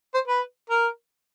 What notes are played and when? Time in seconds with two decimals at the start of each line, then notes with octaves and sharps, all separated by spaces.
0.14 C5
0.28 B4
0.70 A#4